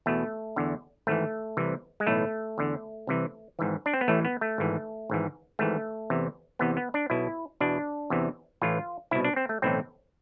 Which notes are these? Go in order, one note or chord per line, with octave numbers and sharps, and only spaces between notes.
E2 B2 A3
E2 D3
G#1 G#2 E3 A3
C2 C3 E3
G#3
B1 A2 E3 A3
E2 D3
C2 C3 E3
G#1 G#2 E3
D4
C4
B3
A1 A2 E3 A3
B3
A3
G#1 G#2 E3
G#1 G#2 E3
G#1 G#2 E3 A3
E2 C3 E3
E2 C3 E3 B3
B3
D4
B1 B2 E4
E2 B2 D4
E2 C3 E3
A1 A2 E3 F4
C2 B2 E4
D4
C4
A3
B1 A2 E3 C4